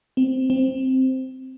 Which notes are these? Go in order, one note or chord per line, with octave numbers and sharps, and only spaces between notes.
C4
C4